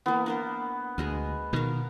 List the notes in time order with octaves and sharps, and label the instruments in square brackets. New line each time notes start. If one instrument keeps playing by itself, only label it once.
[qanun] E3 A#3 [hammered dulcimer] B3
[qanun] D4 A#4 C5
[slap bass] D2 [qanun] G#3 D#5 G#5
[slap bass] B2 D#3 [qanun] A#4 F5